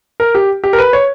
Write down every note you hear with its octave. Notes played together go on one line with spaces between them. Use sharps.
A#4
G4
G4
A#4
B4
C#5